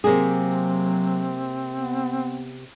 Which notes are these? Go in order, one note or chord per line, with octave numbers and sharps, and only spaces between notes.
C3 F#3 A#3 C4 G#4
B3